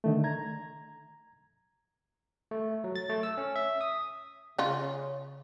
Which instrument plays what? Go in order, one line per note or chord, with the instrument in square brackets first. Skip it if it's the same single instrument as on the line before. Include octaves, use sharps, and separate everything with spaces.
[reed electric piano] D3 D#3 A3
A#5 G#6
[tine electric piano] A3
F#3
A6
A3
E6
C#4
E5
D#6
[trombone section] C#3 [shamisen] C#4 F4